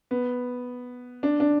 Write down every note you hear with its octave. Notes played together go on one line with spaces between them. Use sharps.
B3
D4
D4